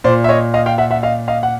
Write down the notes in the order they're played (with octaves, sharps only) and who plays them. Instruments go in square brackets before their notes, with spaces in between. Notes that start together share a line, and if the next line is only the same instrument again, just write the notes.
[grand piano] A#2 C5 D5
E5
C#5 D#5
D#5 F5
F5 G5
E5 F#5
E5 F#5
D#5 F5
D#5 F5
F#5